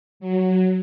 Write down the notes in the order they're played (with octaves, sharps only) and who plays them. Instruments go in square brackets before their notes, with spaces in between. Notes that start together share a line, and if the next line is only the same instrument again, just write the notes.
[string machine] F#3